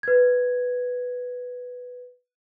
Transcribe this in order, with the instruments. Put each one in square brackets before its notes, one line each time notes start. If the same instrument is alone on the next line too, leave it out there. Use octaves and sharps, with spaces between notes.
[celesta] B4 G#6